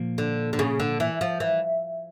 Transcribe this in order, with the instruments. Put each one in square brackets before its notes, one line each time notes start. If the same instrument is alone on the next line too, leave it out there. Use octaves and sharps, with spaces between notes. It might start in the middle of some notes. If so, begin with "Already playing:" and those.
Already playing: [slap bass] A#2 F3 A#3
[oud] D3
D3
C#3
D3
E3
F3
E3